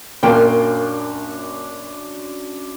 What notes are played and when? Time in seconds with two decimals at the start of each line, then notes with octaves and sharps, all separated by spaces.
0.23 F#2 A#2 A#3 D4 G5 C6